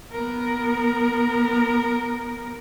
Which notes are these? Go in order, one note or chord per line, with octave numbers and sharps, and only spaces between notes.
B3 A#4